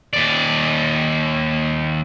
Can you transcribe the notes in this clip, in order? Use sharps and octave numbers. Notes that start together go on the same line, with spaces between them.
D#2 D5